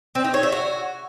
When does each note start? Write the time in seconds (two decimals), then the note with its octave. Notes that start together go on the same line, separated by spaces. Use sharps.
0.15 C4
0.25 D#4
0.34 C#5
0.43 E5
0.52 F#4